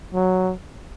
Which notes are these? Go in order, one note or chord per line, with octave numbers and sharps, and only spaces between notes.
F#3